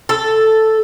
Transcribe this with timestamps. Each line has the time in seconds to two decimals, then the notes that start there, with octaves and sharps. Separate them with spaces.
0.09 A4